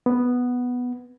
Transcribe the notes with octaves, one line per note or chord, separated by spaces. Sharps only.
B3